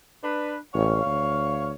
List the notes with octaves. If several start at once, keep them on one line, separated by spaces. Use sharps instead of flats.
D4 B4
A1 C#5 F5
D2